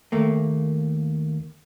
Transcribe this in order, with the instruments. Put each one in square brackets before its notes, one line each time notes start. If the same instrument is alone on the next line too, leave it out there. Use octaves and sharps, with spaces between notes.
[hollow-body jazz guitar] D#2 A3 A#3